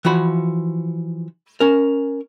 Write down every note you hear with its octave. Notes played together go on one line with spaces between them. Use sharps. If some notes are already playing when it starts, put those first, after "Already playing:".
E3 F3 F#4 B5
C#4 A#4